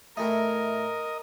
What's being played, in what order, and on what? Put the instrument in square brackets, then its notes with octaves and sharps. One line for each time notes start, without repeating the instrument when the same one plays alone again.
[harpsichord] A2 E3 A3 [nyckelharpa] A#4 [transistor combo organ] D#5